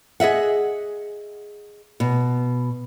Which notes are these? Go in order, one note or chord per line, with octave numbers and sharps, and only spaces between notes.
G#4 D#5 E5 F#5
B2